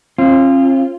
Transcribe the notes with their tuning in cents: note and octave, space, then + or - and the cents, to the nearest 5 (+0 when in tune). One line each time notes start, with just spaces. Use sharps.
C4 +45 F4 -15